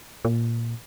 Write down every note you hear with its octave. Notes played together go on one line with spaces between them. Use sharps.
A#2